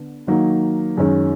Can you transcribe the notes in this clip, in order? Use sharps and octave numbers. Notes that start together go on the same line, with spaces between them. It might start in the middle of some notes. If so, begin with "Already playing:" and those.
Already playing: D3 B3
D#3 F#3 A#3 D#4
F#2 D#3 G#3 C#4